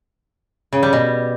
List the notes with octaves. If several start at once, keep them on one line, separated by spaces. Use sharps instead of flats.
C#3
G3
B2